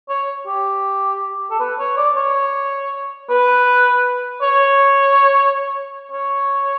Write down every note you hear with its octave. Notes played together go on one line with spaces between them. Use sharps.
C#5
G4
A4
B4
C#5
D5
C#5
B4
C#5
C#5